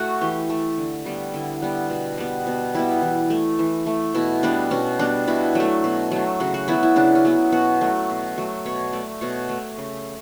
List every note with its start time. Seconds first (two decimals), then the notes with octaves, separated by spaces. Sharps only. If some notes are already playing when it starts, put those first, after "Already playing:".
Already playing: A3 F#4
0.21 E3 G4
0.50 A3
0.78 D3
1.05 G3 B3
1.34 D3 E4
1.62 G3 B3
1.90 B2
2.18 G3 B3
2.47 B2
2.75 G3 B3 E4
3.02 E3
3.30 A3
3.59 E3
3.86 A3
4.15 B2 E4
4.43 G3 B3 D4
4.71 B2 C#4
4.99 G3 B3 D4
5.28 B2 E4
5.55 F#3 A3
5.84 B2
6.11 F#3 A3
6.40 C#3 F#4
6.54 F#4
6.68 F#3 B3 E4
6.83 E4
6.96 C#3 D4
7.15 C#4
7.25 F#3 B3
7.52 B2 F#4
7.81 F#3 A3
8.10 B2
8.38 F#3 A3
8.66 B2 C#5
8.93 A3 D5
9.21 B2 C#5
9.49 A3
9.78 C#3